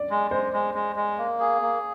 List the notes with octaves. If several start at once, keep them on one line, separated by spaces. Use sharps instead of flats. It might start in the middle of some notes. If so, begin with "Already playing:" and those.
Already playing: D5
G#3
G#3 C5
G#3
G#3
G#3
A#3
G#4
A#3